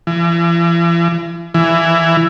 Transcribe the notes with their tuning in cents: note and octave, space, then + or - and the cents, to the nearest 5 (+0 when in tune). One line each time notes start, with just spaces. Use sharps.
E3 +45
E3 +15